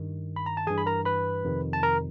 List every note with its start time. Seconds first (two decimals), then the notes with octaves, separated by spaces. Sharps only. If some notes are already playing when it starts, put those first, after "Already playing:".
Already playing: G2 D#3
0.36 B5
0.46 A#5
0.57 A5
0.67 G2 E3 G#4 G#5
0.78 B5
0.86 A#4 A#5
1.05 B4 B5
1.44 F2 C3 D#3
1.73 A5
1.83 A#4 A#5